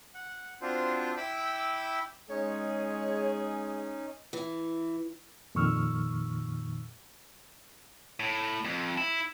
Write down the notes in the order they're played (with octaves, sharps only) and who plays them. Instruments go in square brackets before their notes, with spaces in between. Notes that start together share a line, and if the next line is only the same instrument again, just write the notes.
[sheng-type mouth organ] F#5
C4 D4 F4 F#4 C5
E4 G5 B5 D6 E6
[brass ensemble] G#3 G#4 [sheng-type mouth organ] C#4 D#4 [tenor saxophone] C#5
[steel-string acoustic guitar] E3
[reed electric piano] F2 A#2 D#3 C#6 E6 F6
[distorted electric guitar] A2
F2
E4